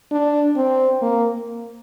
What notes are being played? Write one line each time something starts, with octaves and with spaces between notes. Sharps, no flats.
D4
C4
A#3